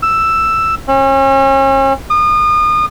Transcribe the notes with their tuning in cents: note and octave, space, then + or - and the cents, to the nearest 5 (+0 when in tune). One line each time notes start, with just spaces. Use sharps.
E6 +5
C#4 -40
D#6 -35